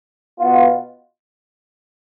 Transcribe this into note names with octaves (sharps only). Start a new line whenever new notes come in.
B2 B3 F4